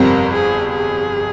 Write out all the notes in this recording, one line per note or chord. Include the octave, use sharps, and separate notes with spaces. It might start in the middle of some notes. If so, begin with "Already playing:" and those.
Already playing: G1 F2 C3 G3 C4 A#4
G#4
G#4